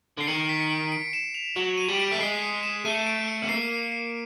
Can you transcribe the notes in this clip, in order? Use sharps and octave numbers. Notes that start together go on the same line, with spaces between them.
D3 C7
D#3 C#7
B6
C#7
D7
D7
E7
F7
F#3 E7
D#7
G3
D7
A3 B6
G#3 C7
C#7
E7
A3 D#7
D7
C#7
B3
A#3 C7
C7